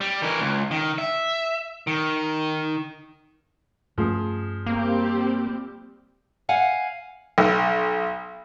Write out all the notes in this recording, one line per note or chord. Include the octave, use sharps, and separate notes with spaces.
G3
E3 A#4
C#2
D#3
E5
D#3
G2 F3 A3 C#4 G#4
G3 A#3 C4 G4
F5 F#5 G#5
B1